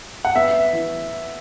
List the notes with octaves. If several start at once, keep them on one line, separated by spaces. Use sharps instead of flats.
F#5
B3 E5
E3